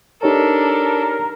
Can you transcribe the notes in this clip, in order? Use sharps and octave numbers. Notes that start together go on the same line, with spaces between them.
D4 D#4 G4 A4 A#4 C#5